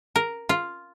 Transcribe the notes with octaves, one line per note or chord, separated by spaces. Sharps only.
A#4
F4